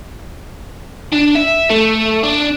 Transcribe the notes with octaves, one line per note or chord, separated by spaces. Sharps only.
D4
E5
A3
D4